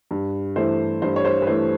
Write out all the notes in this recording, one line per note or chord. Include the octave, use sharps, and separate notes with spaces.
G2
E3 A3 C5
G2 C5
C#5
C5
B4
E3 A3 C5